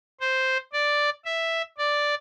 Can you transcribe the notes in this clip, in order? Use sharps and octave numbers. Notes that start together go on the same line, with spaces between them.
C5
D5
E5
D5